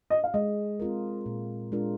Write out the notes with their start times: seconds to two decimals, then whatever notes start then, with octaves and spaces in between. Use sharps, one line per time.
0.10 D#5
0.24 F5
0.34 G#3 D#5
0.80 C4 F4 A#4
1.26 A#2
1.72 G#3 D4 F4 A#4